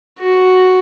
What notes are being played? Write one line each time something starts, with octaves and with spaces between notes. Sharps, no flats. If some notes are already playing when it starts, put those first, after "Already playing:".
F#4